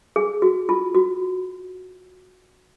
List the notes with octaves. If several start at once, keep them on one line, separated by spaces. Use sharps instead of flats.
G#4
F#4
F4
F#4